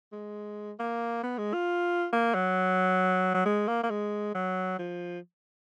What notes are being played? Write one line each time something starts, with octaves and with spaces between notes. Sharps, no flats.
G#3
A#3
B3
G#3
F4
A#3
F#3
F#3
G#3
A#3
A#3
G#3
F#3
F3